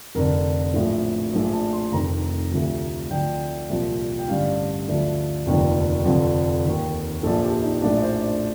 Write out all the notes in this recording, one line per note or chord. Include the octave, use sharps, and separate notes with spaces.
F1 F2 D3 A#4
A#1 A2 F3
A#1 A2 F3 D5
A5
C6
F1 F2 D#3 A#5
D2 C3 F3
D2 D3 F3 G5
C2 A#2 F3
G5
A1 G2 D3 F5
D2 D3 F3
F1 D#2 D3 F3
F1 F2 D3 F3
D#2 D#3
A#1 A#2 F3 A4
G4
D#4
A#1 A2 F3 D4
D5
C5
D5